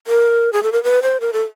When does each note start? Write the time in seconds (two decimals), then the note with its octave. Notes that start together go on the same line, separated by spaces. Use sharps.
0.07 A#4
0.53 G#4
0.63 A4
0.72 A#4
0.84 B4
1.02 C5
1.21 A#4
1.33 A4